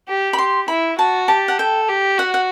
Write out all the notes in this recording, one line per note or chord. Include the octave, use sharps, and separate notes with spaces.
G4
B5
G4 C6
E4 B5
F#4 A5
G4 A5
F#5
A4 G5
G4
F#4 F#5
F#5